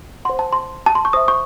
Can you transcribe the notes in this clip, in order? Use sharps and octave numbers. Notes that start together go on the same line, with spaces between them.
C5 F#5 C6
A5
C6
A5
C6
C#6
C5 E5 D#6
C#6